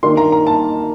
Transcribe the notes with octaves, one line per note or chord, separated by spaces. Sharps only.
D#3 A#3 D4 C6
A#5
A#5
A5